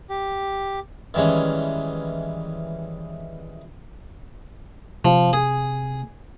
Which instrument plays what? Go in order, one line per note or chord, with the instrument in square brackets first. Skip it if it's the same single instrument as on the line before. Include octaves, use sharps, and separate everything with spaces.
[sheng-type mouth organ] G4
[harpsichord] D#3 E3 G3 G#3 C#4
[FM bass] C3 [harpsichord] F3
[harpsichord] G#4